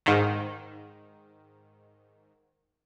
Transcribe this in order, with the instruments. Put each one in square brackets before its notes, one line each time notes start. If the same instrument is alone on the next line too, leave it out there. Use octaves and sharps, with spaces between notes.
[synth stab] G#2 D#3